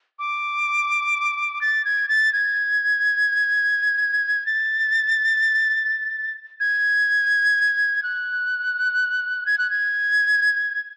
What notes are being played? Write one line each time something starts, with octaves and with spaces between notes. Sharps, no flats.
D6
A6
G#6
A6
G#6
A6
G#6
F#6
G#6
F#6
G#6